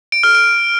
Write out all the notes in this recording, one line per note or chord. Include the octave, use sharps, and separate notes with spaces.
D7
F6
D7